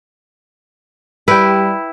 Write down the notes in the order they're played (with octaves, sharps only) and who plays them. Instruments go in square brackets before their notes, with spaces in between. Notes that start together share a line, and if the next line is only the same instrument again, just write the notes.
[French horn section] G3 [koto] E4 [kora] B4 G5